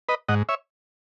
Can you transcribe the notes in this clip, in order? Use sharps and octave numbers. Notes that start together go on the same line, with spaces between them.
B4 D#5
G#2 D#5 F#5
C#5 E5